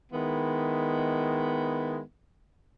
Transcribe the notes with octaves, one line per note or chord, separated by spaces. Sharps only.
D#3 G#3 B3 E4